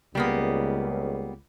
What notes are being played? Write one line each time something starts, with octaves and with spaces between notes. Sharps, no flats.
C#2 G3 A#3 B3